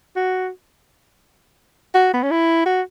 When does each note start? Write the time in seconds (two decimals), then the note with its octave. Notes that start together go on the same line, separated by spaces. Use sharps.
0.16 F#4
1.94 F#4
2.14 B3
2.23 C#4
2.31 E4
2.65 F#4